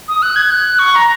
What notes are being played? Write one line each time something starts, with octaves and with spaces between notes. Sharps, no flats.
D#6
F#6
G#6
F#6
C#6
A#5